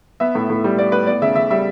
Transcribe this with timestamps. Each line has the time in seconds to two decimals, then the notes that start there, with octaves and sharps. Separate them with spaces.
0.20 B3 E5
0.35 A2
0.50 A2
0.64 G3
0.78 B3 D5
0.92 A2 B4
1.07 B3 D5
1.22 C#3 E5
1.35 C#3 E5
1.50 G3 E5